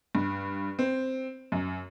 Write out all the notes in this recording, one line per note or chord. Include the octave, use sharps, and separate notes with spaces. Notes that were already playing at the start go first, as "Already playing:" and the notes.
G2
C4
F#2